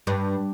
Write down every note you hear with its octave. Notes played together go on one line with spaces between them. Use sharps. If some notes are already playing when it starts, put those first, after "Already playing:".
G2